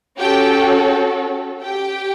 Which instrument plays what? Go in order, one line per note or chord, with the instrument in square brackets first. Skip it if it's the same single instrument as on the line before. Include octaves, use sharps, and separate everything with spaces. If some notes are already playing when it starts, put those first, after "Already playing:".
[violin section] C#4 F#4 G4 A4 G5
G4 G5